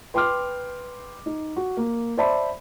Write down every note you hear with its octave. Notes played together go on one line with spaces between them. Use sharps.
B4 G5 C6 D6 F6
D#4
F#4
A#3
C5 D5 E5 A5 B5